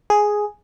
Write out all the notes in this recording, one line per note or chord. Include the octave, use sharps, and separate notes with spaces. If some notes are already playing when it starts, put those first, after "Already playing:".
G#4